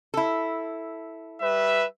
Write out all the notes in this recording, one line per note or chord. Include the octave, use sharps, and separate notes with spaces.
E4 A4
G3 B4 E5